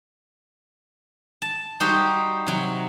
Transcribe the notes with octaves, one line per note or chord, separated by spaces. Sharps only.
A5
G3 D#4 F#4 G4 C5
C3 F#3